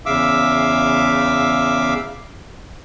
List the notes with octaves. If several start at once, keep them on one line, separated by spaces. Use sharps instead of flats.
E2 C#3 E5 F5 D6 E6